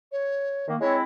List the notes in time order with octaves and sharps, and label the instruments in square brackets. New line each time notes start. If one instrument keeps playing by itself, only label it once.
[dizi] C#5
[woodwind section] D#3 A#3
[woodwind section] G#3 C4 E4 [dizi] C#5